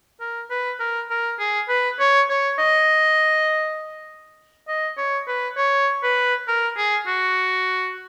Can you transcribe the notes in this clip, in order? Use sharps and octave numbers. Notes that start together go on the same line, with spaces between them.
A#4
B4
A#4
A#4
G#4
B4
C#5
C#5
D#5
D#5
C#5
B4
C#5
B4
A#4
G#4
F#4